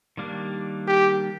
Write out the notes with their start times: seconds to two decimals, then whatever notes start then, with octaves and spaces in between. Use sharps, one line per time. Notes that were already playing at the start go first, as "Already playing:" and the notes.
0.17 D#3 G3 A#3 D4
0.87 G4